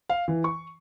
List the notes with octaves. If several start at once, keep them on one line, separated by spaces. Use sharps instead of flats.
F5
E3
C#6